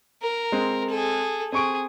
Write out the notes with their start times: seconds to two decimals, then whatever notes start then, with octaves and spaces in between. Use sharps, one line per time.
0.22 A#4
0.52 G#3 C4
0.89 G#4 A4
1.52 C4 G#4 C#6 D7